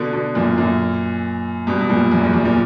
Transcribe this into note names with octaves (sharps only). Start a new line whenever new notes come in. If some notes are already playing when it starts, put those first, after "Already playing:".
Already playing: B2 D3
B2 D3
F#2 A#2
F#2 A#2
G2 B2
G2
F#2 A#2
F#2
E2
F#2
A#2